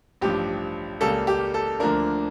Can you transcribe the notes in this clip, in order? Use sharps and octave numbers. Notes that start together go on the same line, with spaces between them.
A1 G2 F3 G4
C#2 C#3 G3 A#3 A4
G4
A4
D2 D3 F3 A#3 D4 A#4